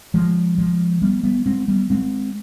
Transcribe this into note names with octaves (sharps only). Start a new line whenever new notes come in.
F3 G#3
F3 G#3
G3 B3
G3 B3
G#3 C4
G3 B3
G#3 C4